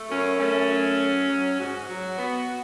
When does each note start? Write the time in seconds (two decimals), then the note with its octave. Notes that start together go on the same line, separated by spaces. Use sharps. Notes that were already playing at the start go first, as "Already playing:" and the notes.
Already playing: A3
0.11 F#2 C#4
0.40 A3 C#4
0.71 F#3
1.00 F#3
1.29 F#3
1.60 G#2 F#4
1.89 F#3
2.18 B3